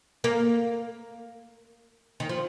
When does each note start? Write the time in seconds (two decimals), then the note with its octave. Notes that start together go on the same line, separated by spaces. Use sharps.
0.24 A#3
2.20 D#3
2.29 F3